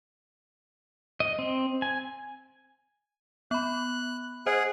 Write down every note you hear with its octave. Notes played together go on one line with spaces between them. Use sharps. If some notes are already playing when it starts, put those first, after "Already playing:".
D#5
C4
G#5
B3 B5 F#6
G#4 C5 D#5 F#5